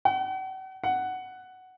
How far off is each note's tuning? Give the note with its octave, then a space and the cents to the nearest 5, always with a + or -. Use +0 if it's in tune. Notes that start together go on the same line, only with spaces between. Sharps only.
F#5 +40
F#5 +5